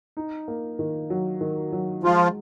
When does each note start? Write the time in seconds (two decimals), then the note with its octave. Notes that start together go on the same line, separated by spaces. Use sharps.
0.17 D#4
0.48 A#3
0.79 D#3
1.10 F#3
1.41 D#3
1.72 F#3
2.03 F3 G#3 F4